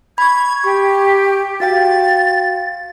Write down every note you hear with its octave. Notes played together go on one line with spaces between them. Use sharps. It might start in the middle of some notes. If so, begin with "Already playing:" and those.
B5 C#6 G#6
G4 C#6
F#4 F5 G5 A6